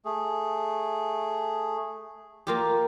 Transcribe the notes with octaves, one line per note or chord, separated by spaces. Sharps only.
A3 G#4
A#3 F4 G4